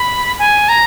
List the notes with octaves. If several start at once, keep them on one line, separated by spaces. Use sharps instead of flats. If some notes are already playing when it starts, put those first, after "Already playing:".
Already playing: B5
G#5
A#5